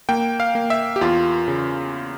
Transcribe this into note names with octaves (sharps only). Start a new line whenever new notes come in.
A#3 G5
F5
A#3
E5
G4
E2 F4
C#3